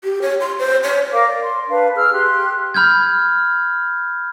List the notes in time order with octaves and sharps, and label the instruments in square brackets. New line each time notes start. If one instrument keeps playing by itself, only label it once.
[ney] G4
C#5
C6
C5
C#5
[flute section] A#4 F5 D6
D5
C6
D4 B4 F5
G#4 E6 F6
G4 C6 F#6
[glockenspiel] B5 F6 G6 G#6